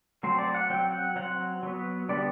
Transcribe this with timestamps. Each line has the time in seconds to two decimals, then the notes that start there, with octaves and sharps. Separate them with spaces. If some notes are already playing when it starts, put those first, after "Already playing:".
0.23 F#3 A3 C4 C5
0.38 D5
0.55 F#5
0.70 F#3 C4 G5
0.92 F#5
1.16 F#3 C4 F#5
1.63 F#3 B3
2.09 D3 G3 B3 D5